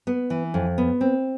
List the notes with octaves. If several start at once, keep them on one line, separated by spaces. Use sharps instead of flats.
B3
E3
F2
B3
C4